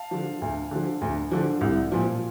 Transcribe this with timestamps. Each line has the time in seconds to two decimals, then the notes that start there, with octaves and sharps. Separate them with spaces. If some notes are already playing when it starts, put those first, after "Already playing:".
Already playing: F5 A5
0.11 D3 F3
0.42 D2
0.71 D3 F3
1.01 D2
1.31 D3 F3
1.61 C2
1.92 A#2 F3